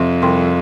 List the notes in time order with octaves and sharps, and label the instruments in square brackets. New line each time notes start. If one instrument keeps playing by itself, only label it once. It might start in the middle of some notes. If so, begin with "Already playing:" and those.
Already playing: [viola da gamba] F2 [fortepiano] C3
[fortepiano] C2